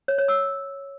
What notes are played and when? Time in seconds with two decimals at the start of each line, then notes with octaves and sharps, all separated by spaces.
0.08 C#5
0.18 C#5
0.28 E6